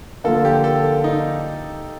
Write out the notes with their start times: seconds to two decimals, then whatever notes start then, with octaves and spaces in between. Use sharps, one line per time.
0.24 D3 F3 A#3 F4 A4 A#4
0.45 G4
0.64 A4
1.04 D#4